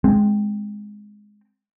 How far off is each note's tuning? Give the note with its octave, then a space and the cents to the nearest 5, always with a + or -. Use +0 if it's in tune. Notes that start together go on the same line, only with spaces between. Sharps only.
G#3 +0 C4 +0